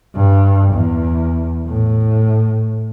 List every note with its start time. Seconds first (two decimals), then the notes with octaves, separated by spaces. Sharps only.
0.16 G2
0.74 E2
1.66 A2